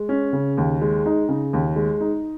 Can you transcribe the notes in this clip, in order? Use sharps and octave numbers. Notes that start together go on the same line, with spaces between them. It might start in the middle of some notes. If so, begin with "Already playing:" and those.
Already playing: G#3
C#4
C#3
D#2
G#3
D#4
C#3
D#2
G#3
D#4